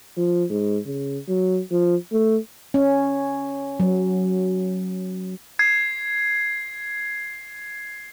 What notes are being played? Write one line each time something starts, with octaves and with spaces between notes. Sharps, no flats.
F3
G#2
C#3
F#3
F3
A3
C#4
F#3
G#6 C7